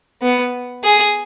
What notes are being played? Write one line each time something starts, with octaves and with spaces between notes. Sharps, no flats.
B3
G#4